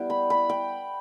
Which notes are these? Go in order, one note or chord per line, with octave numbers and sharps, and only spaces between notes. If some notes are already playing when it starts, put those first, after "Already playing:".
Already playing: G3 B3 E4 G5
B5
B5
G5